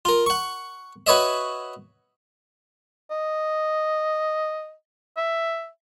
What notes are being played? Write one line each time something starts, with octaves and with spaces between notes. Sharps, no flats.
F4 A#4
F#5 C#6
F#4 B4 C#5 D#5 E5
D#5
E5